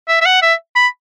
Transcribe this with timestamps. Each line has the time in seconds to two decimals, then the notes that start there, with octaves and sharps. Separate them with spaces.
0.09 E5
0.21 E5
0.26 F#5
0.42 E5
0.76 B5